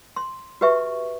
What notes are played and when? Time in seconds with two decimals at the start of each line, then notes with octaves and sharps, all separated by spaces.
0.16 C6
0.61 F#4 G4 B4 E5 C#6